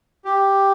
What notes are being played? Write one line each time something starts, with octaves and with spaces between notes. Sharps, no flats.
G4